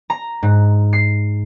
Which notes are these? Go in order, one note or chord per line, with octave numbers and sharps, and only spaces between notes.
A#5
G#2
C7